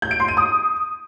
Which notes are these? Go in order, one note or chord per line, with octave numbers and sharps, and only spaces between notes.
G6
D7
C6
D#7
D#6